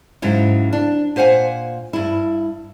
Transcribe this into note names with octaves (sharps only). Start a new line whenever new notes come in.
G#2 C#3 F#3 E4
D4
A#2 C5 F5 F#5 G#5
G2 E4